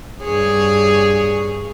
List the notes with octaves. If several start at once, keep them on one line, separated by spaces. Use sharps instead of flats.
G2 G#4 C#5